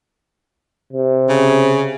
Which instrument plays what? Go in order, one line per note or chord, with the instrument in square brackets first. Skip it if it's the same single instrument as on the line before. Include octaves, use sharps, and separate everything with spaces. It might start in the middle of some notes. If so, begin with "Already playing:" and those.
[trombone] C3
[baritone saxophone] C#3